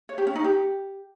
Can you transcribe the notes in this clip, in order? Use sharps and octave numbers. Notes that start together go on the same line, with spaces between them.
C#5
G4
C#4
D#4
G4